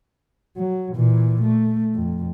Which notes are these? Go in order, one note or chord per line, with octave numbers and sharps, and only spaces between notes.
F#3
A#2 E3
A3
F2